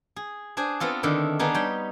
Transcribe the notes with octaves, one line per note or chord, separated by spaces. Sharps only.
G#4
D4 G#4 C5 G#5
B3 C4 F4 A4
D3 D#3 D4 E4
B3 D4 D#4 G#4
G3 C#5 G5